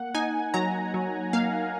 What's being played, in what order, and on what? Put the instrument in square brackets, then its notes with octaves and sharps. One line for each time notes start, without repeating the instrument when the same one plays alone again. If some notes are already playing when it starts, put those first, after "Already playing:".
Already playing: [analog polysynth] A#3 F#5
D#4 G#5
F#3 A#5
F#3
A#3 F5